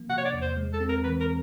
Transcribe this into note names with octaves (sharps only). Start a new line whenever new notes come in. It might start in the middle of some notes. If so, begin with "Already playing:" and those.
Already playing: F3 A#3
C3 F#5
C#5
D5
E2
C5
G#3
A4
C4
A#4
E3 B4
A#4